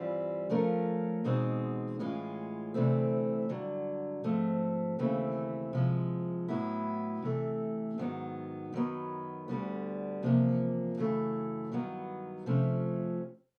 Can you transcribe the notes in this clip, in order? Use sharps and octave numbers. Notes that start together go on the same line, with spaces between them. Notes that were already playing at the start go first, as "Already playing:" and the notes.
Already playing: G2 E3 G3 C4 F4
F3 A3 C#4 F4 A#4
E2 B2 G#3 C4 D#4
A2 E3 G#3 C#4 F4
D2 C3 E3 A3 C4
G2 D3 F#3
G#2 F3 A3 C4
D#2 C#3 E3 A3 C4
C3 F3 G#3
A2 F#3 B3 E4
C3 E3 A3
G#2 D#3 F#3 B3
F#2 D#3 F#3 B3
D2 D3 G3 B3
E2 C3 F3 A#3
F#2 C#3 E3 A3
G2 D#3 F#3 B3
C3 F3 A3 C#4